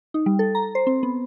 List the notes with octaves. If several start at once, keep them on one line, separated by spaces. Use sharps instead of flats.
D#4
G3
A4
A#5
C5
C4
B3